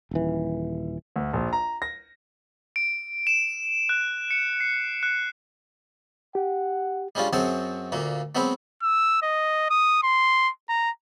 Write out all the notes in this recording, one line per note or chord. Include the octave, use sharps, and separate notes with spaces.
D#1 E3
D2
A#1
A#5
A#6
D7
E7
F#6
C#7
C7
F#6
G4 F#5
G3 G#3 C#4 D4 F4
F#2 F#3 C4 G#4 A5
D2 A#2 A#3
F#3 G#3 B3 C4 B4
E6
D#5
D#6
C6
A#5